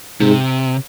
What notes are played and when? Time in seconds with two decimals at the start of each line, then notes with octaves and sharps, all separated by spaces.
0.20 G#2 C3